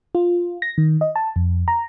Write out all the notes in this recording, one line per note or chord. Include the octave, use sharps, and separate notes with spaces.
F4
A#6
D#3
D#5
A5
F2
A#5